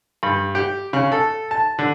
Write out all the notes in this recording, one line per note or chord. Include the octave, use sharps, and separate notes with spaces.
G2
G4
C#3
A4
A5
D3